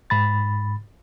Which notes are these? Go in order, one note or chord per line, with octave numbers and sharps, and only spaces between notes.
G#2 B5 A6